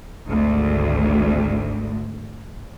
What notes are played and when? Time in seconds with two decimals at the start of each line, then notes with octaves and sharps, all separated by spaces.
0.27 G#1 D2